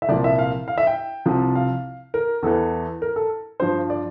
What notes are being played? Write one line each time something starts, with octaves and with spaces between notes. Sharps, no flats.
E5
C2 A#2 F3 D5
E5
F5
F5
E5
G5
C2 C3 F3
F5
A#4
E2 E3 A4
A#4
A4
G2 F3 C5
D5